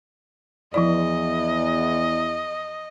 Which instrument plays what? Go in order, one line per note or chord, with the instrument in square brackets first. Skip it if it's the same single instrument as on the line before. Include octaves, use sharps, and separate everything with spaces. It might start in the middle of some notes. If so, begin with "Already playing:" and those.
[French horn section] E2 [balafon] F3 E4 D5 [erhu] D#5